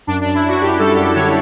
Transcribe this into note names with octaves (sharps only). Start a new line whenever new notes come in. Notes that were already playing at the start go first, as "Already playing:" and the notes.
F#2 D4
F#2 D4
E4
F#2 F#4
F#2 G4
G3 A4
F#2 G4
D3 C#5